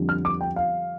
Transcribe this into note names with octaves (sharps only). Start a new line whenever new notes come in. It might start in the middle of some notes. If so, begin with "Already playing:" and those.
Already playing: F2 D3 G3
F6
D6
G5
F5